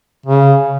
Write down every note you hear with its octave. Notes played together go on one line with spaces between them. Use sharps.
C#3